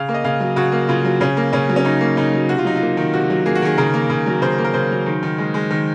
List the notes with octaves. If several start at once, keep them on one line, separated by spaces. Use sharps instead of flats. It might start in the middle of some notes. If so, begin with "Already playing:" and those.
Already playing: C#3 F5
A#3
D#5
C#3 F5
F#3
C#3 F#4
A#3
C#3 F4
F#3
C#3 C#4
A#3
C#3 C#4
F#3
C#4
C#3 D#4
A#3
C#3 D#4
F#3
C3 F#4
F4
F#3 D#4
F4
A#3
D#3
C3 F#4
F#3
A#3 G#4
F#4
D#3 G#4
C#3 A#4
A#3
C#3
F#3
C#3 C5
A#3
A#4
C#3 C5
F#3
D#3
D#3
G#3
G#3
D#3